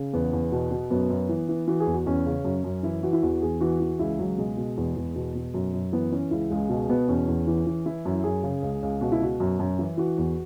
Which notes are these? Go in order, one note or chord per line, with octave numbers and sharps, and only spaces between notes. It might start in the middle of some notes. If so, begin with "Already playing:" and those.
Already playing: C#3
E2 B3
E2
B2
B2
F#2 B3
F#2
E3
E3
E3 F#4
G#4
E2
F#4
E2 C#4
C#3
F#2
F#2
E3 E4
E3 F#4
E4
E2 F#4
E2 G#4
E3 F#4
E3
C#2 E4
C#2 F#3
B2 G#3
B2
E2
E2
B2
B2
F#2
F#2
E3 B3
E3 C#4
C#2 E4
C#2 G#3
B2 G#3
B2 B3
E2 C#4
E2
E3
E3
E3 E4
F#2
F#2 G#4
C#3
C#2
C#2
B2 F#4
E4
B2 F#4
F#2
F#2
E3 E4
E3 F#4
E2